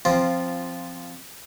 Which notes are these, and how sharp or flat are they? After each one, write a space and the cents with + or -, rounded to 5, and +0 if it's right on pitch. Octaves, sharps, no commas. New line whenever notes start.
F3 +0 C4 +0 F4 -10